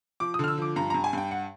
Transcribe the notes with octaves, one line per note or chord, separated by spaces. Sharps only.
F3 D6
D#6
D3 F6
E6
F3 D6
G2 A#5
G2 A#5
G#5
G2 G5
F#5